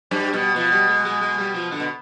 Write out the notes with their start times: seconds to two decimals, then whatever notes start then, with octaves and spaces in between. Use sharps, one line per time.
0.11 G2 G3
0.33 B2 G3
0.56 B2 F3
0.72 G3
0.89 G#3
1.06 G#3
1.22 G#3
1.39 G3
1.55 F3
1.72 D3
1.80 B2